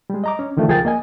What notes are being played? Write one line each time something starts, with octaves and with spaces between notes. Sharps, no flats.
G3 G#3
D#5 A#5 D6
C#4
D3 D#3 F3 A3
C#2 F3 G#4 A#4 G5 A6
A#3 D#5 G#5